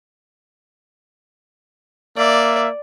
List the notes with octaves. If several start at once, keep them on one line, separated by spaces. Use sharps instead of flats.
A#3 D5 E5